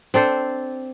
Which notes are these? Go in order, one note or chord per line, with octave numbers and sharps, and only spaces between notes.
C4 D4 A4 C5